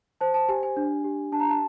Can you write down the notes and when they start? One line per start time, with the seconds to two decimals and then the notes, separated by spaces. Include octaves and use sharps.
0.21 C5 A5
0.34 A5
0.49 G4 G#5
0.63 G#5
0.77 D4
1.04 G4
1.32 D4 A5
1.40 A#5
1.49 A5